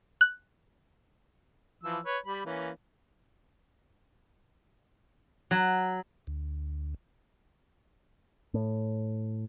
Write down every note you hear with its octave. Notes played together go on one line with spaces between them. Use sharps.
F#6
E3 F3 E6
B4 C#5
G3 B5
E3 A#3 C#4
F#3
D2
A2